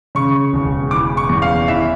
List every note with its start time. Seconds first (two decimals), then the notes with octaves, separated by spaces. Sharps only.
0.15 C#3 C#6
0.53 E1
0.91 E3 D6
1.17 C#6
1.29 E2
1.42 F5
1.68 E3 E5